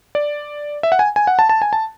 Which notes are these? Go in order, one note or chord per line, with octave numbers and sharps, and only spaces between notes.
D5
E5
F#5
G#5
G#5
F#5
A5
A5
G#5
A5